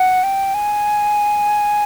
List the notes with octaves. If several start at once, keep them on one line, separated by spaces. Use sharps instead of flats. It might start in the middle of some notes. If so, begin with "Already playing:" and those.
Already playing: F#5
G5
G#5